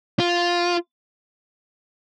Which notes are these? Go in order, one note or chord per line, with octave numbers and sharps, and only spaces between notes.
F4